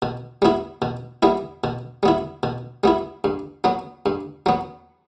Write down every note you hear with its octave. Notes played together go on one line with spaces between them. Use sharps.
B2
G3 B3 E4
B2
G3 B3 E4
B2
G3 B3 E4
B2
G3 B3 E4
G2
F#3 B3
G2
F#3 B3